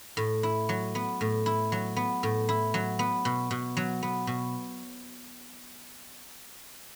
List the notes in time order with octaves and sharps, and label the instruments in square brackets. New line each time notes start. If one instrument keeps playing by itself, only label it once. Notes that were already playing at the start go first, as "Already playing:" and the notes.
[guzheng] A2
E4
F#3
B3
A2
E4
F#3
B3
A2
E4
F#3
B3
B2
B2
F#3
B3
B2